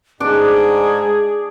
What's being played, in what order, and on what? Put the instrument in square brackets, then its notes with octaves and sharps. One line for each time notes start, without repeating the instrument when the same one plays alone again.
[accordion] G#2 [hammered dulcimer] D4 D5 [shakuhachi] G#4